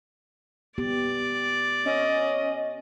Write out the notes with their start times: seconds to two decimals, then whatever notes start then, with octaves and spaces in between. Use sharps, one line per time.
0.78 B3 G4 D5
1.86 C#4 D#5